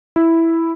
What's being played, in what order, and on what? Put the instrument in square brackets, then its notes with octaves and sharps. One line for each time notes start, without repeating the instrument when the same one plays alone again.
[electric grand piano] E4